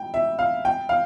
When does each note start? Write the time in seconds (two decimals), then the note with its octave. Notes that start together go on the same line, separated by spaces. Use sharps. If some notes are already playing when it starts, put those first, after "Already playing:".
Already playing: G5
0.14 E5
0.39 F5
0.65 G5
0.89 F5